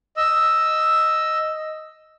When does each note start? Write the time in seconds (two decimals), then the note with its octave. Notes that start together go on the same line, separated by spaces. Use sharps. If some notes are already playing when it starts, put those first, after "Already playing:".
0.17 D#5 E6